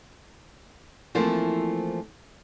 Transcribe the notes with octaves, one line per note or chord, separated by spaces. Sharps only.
E3 F3 A3 A#3 C4 E4